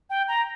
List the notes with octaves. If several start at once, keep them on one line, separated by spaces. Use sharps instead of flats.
G5
A#5